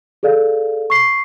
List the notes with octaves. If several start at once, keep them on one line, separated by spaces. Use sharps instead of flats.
G#4 A4 D5 F5
C#6 C7